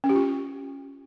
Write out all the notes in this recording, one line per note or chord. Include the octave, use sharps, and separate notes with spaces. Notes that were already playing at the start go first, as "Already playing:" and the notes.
C#4
G4
F4